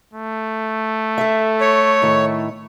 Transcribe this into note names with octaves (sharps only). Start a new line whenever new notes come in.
A3
A4 E5
C#5
A2 D#3 E4